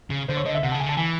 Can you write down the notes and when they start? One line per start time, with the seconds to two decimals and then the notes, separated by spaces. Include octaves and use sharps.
0.10 C#3
0.28 D3 C5
0.37 C#5
0.45 D3 D#5
0.54 E5
0.63 C3 F#5
0.72 A5
0.75 C#3
0.80 G#5
0.86 D3 A5
0.97 E3 G#5